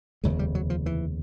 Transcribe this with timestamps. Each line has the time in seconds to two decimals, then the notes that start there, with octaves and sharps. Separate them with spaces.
0.24 F1 D#2 C#3 G#3
0.39 G3
0.55 F#3
0.70 F3
0.86 E3